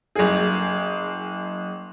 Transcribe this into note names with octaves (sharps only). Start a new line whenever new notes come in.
F#1 G#4